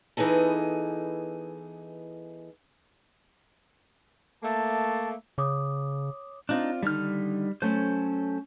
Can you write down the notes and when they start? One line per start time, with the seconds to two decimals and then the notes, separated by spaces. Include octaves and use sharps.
0.17 E3 B3 D#4 G#4 A4
4.43 A3 A#3 A5
5.38 C#3 C#5 D6 D#6
6.49 C4 D4 D#4 F4 D5
6.83 D3 D#3 G3 D#4 F6
7.62 F#3 A3 C#4 A4 C5